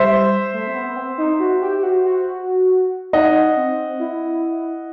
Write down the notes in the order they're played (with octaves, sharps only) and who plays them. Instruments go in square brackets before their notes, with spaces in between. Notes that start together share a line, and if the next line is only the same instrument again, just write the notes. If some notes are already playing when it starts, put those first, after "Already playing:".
Already playing: [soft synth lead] G3 [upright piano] C5 E5
[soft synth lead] A3
C4
B3
B3
C4
D#4
F#4
G4
G4
F#4
F#4
[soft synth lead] D#4 [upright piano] D#5 F#5
[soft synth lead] C4
E4